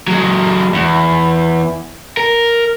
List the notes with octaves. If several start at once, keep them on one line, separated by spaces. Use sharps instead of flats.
F#3 G#3
E2
A#4